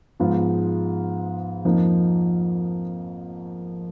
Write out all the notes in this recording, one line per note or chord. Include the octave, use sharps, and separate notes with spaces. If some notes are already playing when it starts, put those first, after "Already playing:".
G#2 F3 B3 F4
F2 F3 A#3 D#4